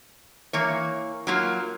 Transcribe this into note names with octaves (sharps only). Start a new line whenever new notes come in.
E3 A#3 C#5
F#3 A#3 F4